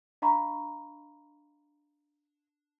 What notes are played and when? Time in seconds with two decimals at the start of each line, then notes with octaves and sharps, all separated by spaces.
0.22 D4 D#5 F5 A#5 B5 C#6